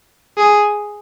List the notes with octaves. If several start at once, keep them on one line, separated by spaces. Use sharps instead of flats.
G#4